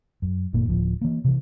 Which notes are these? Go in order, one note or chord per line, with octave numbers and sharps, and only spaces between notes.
F#2
G1 F#2 A#2 A#3
D1 F3
E3 A#3
C3 E3